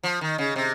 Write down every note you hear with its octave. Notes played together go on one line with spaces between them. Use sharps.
F3
D#3
C#3
C3